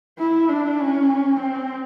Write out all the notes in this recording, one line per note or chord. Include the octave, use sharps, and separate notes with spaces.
E4
D4
C#4
C4